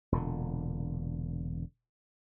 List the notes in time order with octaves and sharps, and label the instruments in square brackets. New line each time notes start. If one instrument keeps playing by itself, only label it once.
[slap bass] E1 A#2 D3